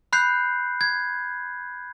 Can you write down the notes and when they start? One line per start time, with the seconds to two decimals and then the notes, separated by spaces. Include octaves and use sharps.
0.13 B5 F#6 G6 C7
0.81 G#6